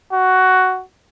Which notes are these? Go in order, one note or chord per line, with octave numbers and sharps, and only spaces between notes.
F#4